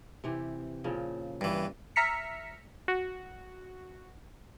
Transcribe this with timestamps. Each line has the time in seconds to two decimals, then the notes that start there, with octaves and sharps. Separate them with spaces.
0.24 C3 E3 G4
0.84 A#2 C#3 F3
1.41 G2 E3
1.96 E5 A#5 F6 B6 C#7
2.88 F#4